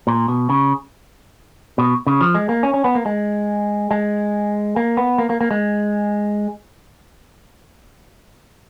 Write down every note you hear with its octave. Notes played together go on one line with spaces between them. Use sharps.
A#2
B2
C#3
B2
C#3
F3
G#3
A#3
C#4
C#4
B3
A#3
G#3
G#3
A#3
B3
A#3
A#3
A#3
G#3